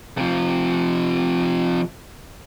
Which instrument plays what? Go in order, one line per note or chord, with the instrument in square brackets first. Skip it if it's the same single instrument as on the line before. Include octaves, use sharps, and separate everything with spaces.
[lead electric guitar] C3 F3